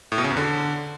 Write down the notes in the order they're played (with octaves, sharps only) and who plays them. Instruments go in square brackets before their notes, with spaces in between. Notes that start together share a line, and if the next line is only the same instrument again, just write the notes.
[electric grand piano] A2
B2
C#3
E2
D3